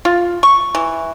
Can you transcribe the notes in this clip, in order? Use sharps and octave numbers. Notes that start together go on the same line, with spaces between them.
F4
C#6
E3